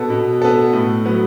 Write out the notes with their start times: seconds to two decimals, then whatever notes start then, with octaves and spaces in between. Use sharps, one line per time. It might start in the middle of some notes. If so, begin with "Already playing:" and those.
Already playing: B2 B3 A4
0.10 B2
0.42 B3 A4
0.74 A2
1.05 F#3 B3